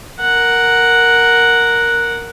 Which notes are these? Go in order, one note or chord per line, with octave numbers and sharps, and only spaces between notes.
A#4 F#5